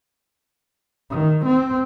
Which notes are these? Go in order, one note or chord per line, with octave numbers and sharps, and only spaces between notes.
D#3
C4